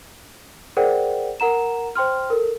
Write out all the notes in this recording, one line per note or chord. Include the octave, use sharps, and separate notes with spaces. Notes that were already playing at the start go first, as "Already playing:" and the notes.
G#4 A#4 C5 D5 F#5 G5
A#4 F#5 A#5 E7
C5 G5 C6 F6
A4 A#4